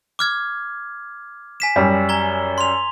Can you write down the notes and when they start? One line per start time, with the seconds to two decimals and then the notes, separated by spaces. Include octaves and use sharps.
0.19 D6 F6 G#6
1.60 G#5 B6 E7
1.76 F#2 G3
2.09 A#5 G#6 G7
2.58 C6 F7